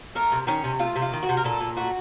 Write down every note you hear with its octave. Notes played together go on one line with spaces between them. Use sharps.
A3 A#4
C3
D#3 C#4
C3
A3 F4
C3
F4
D#3
F#4
C3
A#4
A#2 A4
A#2
A3 F#4